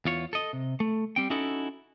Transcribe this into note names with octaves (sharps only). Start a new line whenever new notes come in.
E2 F4 C#5
A4 D#5
C3
A3
G3 C4 G5
C#4 D#4 E4 F#4 A4